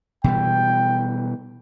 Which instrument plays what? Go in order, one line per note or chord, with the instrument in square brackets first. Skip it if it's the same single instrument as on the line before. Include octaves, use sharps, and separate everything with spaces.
[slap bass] B2 E3 G3 [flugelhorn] G5